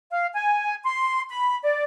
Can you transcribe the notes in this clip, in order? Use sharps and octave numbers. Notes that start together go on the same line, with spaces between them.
F5
G#5
C6
B5
D5